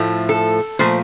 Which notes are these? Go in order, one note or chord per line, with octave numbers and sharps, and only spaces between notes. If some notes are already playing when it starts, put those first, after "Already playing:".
Already playing: A2 F3 A3
A4
A#2 F3 A3 C5